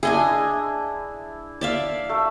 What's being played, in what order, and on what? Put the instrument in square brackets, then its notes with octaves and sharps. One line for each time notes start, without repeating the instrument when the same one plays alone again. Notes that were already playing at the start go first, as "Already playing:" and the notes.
[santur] D4 E4 [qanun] G#4 D#5 G#5
[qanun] D5 E5 F5
[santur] A3 A4